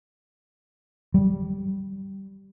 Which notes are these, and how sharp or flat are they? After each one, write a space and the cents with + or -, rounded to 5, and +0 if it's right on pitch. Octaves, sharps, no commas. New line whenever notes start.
G3 -15